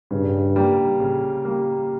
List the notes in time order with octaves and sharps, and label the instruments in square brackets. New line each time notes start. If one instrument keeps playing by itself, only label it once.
[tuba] G2 [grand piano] C#3
[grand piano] G3 A#3
C#3
G3 A#3